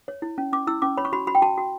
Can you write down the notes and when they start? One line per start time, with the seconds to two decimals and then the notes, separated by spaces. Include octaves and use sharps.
0.08 C#5
0.22 E4
0.38 C#4
0.53 C#4 D6
0.67 E4 E6
0.82 C#4 D6
0.97 C#5 B5
1.05 C#6
1.13 F#4 B5
1.27 F#4 B5
1.35 G5
1.42 F#4 A5
1.58 F#4